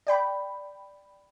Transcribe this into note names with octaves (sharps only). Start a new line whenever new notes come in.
D5 G5 B5